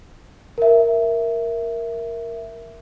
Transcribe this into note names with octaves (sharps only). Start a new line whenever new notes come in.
A#4 E5